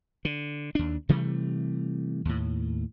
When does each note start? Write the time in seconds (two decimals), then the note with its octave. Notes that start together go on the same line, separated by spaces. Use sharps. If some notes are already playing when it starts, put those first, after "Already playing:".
0.25 D3
0.75 D#2 D4
1.09 C3 E3 G3 A3
2.25 D#2 A2